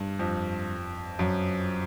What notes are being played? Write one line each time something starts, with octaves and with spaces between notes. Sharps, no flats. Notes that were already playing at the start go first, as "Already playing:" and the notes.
Already playing: G2
F2
F#2